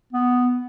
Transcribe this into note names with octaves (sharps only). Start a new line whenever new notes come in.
B3